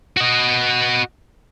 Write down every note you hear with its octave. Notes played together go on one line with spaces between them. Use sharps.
F#4 D#5